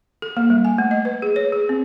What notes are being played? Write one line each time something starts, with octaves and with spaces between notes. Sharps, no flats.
A4
A#3
G3
G#5
A3
D#5
B4
G#4
C#5
G#4
C4